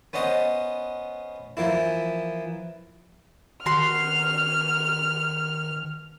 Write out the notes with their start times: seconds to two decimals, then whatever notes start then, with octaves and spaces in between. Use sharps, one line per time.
0.13 B3 C#4 C5 D#5 F#5
1.57 E3 F3 A#3 E4
3.66 D#3 F#4 C6 F6